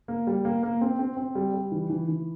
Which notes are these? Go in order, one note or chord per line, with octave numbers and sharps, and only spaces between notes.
A#3
G3
A#3
A#3
C4
C4
C4
G3
G3
E3
E3
E3